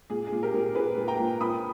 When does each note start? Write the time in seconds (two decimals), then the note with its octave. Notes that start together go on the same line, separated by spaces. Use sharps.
0.10 A#2 G#4
0.27 G#4
0.32 A#2
0.43 G4 A#4
0.54 A#2
0.59 G#4
0.75 A#2 G#4 B4
0.97 A#2
1.08 G5 A#5
1.19 A#2
1.41 A#2 B5 D#6